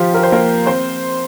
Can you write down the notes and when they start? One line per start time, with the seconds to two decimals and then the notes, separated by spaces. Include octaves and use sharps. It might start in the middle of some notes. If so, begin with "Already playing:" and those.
Already playing: F3 F4 G4
0.14 A#4
0.23 C5
0.32 A#3 A#4
0.66 C4 C5